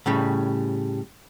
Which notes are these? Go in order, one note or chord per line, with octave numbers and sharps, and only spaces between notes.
A2 C#3 G3